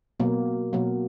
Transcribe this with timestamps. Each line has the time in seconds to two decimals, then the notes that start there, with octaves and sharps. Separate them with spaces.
0.20 B2 F#3 A#3
0.73 B2 F#3 A#3